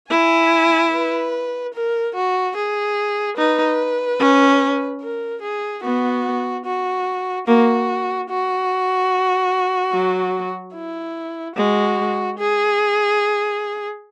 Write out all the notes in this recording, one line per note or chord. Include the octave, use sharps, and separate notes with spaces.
E4 G#5
B4
A#4
F#4
G#4
D#4 B4
C#4
A#4
G#4
B3 F#4
F#4
A#3 F#4
F#4
F#3
E4
G#3 F#4
G#4